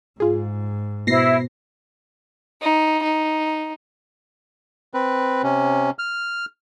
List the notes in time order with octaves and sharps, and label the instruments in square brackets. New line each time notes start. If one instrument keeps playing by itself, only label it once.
[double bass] G#2 [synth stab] F4 G#4
[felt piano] B2 C5 [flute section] E4 [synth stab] A#6 C7
[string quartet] D#4
D#4
[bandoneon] C4 B4
C3 C#4
F6